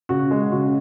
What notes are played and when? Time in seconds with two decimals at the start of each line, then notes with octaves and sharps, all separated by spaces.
0.09 C#3 F#4
0.31 G#3
0.52 C#3 F#4